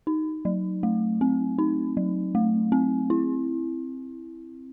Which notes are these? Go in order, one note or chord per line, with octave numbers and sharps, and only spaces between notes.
D#4
F#3
A3
C4
D#4
F#3
A3
C4
E4